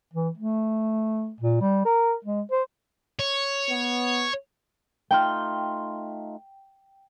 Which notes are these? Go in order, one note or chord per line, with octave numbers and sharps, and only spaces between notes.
E3
A3
A#2
G3
A#4
G#3
C5
C#5
B3
A3 D#4 F4 G5